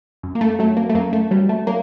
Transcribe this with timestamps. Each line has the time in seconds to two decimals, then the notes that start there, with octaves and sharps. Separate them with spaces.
0.23 F#2
0.35 A#3
0.41 A3
0.59 F#3 A3
0.77 A#3
0.90 A3
0.94 F#2 A#3
1.13 A3
1.31 F#3 G3
1.49 A3
1.67 F#3 A#3